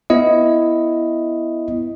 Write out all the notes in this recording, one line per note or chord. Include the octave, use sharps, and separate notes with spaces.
B3 E4 D#5